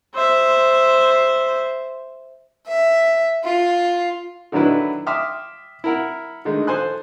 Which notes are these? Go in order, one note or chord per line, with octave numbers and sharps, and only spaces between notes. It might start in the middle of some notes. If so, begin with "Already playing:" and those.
C5 E5
E5
F4
D3 D#3 F#3 D4 E4 B4
E5 G5 C6 D6 D#6 F6
E4 A#4 F#5
D3 D#3 G#3 A3
A4 C5 G#5 C6 F#6